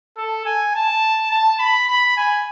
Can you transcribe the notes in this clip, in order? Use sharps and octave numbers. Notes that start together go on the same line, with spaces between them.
A4
G#5
A5
A5
B5
B5
G#5